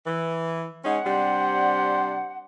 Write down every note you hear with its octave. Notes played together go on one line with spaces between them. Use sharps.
E3
G#3 C#4 D#4 F#5
C3 G3 D4 C5